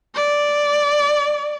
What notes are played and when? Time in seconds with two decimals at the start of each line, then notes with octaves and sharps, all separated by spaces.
0.15 D5